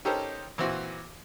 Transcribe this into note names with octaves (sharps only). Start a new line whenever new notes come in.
C#4 D#4 G4 A4 A#4 C5
A#2 E3 C4 F#4